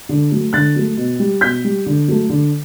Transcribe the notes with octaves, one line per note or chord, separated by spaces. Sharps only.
D3
F#3 A3
D3 F#6 A6
F#3 A3
B2
G3
B2 G6 B6
G3
D3
F#3 A3
D3